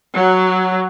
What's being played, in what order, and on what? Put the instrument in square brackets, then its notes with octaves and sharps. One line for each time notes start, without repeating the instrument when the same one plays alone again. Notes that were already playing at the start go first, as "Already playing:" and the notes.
[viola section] F#3